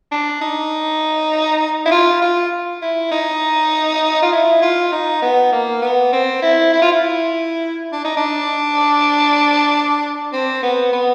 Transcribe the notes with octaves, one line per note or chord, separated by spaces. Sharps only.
D4
D#4
E4
F4
F4
E4
D#4
F4
E4
F4
D#4
B3
A#3
B3
C4
E4
E4
F4
E4
D4
D#4
D4
C4
B3
B3